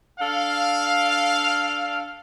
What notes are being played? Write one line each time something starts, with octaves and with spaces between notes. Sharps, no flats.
D4 A4 F5